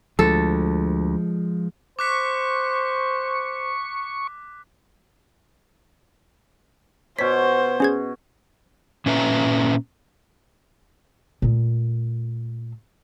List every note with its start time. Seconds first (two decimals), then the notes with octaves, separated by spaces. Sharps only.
0.19 D2 F3 G#3 A4
1.99 C5 C#6 D6 F#6 B6
7.19 B2 C5 C#5 B6
7.80 C#4 G#4 G#6
9.06 A#2 C#4 B4 E5 A#5
11.42 A#2 A3